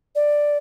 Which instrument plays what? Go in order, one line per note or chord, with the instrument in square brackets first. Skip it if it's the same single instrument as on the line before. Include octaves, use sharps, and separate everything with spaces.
[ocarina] D5